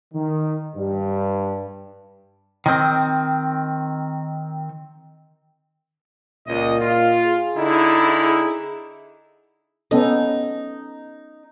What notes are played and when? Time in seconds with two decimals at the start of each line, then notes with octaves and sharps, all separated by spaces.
0.13 D#3
0.76 G2
2.66 D#3 C4
6.48 C#2 A#2 D#5
6.81 F4
7.27 G#4
7.57 D3 D#4 E4
9.91 B3 C#4 D#4 A4